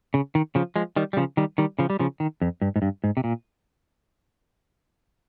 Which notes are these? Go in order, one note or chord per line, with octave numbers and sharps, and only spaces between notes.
C#3
D#3
C#3 F3
F3 G#3
D#3 G3
G3
C#3 F3
D#3 G3
D#3 G3
C#3 F3
G3
C#3 F3
D#3
F2
G2
G#2
G2
G#2
C3
A#2